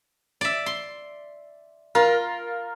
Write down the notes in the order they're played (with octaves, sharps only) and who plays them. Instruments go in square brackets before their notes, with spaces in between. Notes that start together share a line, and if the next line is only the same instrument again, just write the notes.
[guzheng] D5 E5
C6
[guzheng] F4 [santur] A#4